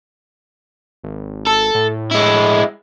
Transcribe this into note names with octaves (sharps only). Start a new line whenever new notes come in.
G#1
A4
A2
G#3 E4